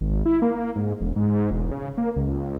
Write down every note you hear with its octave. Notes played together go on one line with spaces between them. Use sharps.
G#1
E4
A#3
G#2
E1
G#2
E1
C#3
A#3
C#2